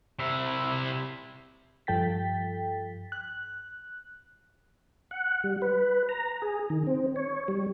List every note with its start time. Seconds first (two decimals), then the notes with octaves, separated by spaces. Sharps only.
0.19 C3 E4
1.87 G2 F3 A4 G5 A6 B6
3.12 F#6
5.11 F#5
5.44 G3
5.62 B4
6.09 A#5
6.42 G#4
6.70 D#3
6.87 C4
7.16 C#5
7.48 G3